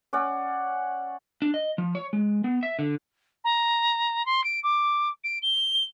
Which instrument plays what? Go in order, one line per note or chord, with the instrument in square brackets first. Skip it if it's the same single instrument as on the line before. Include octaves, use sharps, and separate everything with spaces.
[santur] C#4 D5 F#5
[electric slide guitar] D4
D#5
F3
C#5
G#3
B3
E5
D3
[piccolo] A#5
C6
D7
D6
D7
G7